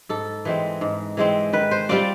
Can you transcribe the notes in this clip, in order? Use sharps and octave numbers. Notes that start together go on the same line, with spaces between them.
G#2 A4
E3 G#3 C4
G#2
E3 G#3 C4
D#3 B4
C5
G3 C4 F4 D5